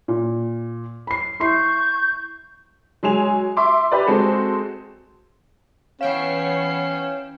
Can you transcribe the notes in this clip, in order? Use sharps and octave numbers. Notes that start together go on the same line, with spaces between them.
A#2
B5 C7
E4 C6 C#6 G6 C7
F#3 G#3 G#5 F7
E5 C6 D6
G4 B4 D5
G#3 C4 F#4 A4 C5
E3 B3 C#4 C#5 F5 G5 C7 E7